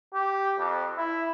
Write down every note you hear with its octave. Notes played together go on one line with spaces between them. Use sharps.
G4
F2
E4